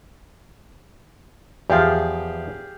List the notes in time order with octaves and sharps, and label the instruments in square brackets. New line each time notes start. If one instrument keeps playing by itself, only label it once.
[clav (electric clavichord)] E2 F3 [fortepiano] G4 G#4 F5